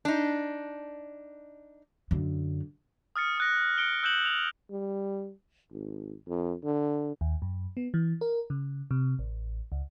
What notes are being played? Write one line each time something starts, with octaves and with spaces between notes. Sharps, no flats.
D4 D#4
F#2 D3
D#6 F6 A6 C#7
D#6 F#6 A#6
C#7 D7 G7
E6 F#6 G6 E7 F#7
F7 F#7
G3
G#1
F2
D3
D#2
F#2
B3
E3
A#4
C#3
C3
A1
C#2